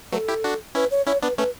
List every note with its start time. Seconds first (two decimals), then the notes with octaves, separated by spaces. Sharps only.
0.12 F#3 A3 B4
0.16 A4
0.28 E4 G4
0.44 D4 F#4
0.75 C#4 E4 B4
0.91 C#5
1.07 C#4 E4 C#5
1.22 B3 D4 B4
1.38 A3 C#4 B4